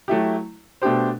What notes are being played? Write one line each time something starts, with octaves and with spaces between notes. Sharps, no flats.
F#3 A3 E4 G4
B2 A3 D4 G4 C5